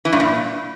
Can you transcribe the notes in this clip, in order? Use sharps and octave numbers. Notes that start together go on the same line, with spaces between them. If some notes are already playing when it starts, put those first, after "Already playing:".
E3
G2
A#2